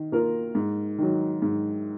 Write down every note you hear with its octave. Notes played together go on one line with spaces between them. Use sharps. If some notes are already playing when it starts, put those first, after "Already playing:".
Already playing: D#3
A#3 F4 A#4
G#2
D#3 F#3
G#2